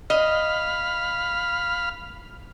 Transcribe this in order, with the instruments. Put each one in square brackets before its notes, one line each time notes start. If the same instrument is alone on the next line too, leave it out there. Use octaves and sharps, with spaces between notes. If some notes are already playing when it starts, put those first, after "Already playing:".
[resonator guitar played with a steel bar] D#5 [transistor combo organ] F5 B5 F6